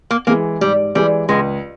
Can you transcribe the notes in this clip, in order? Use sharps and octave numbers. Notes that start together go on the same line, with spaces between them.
A#3
E3 G#3 A#3
G#2 G3
E3 G3 G#3
C#2 G#3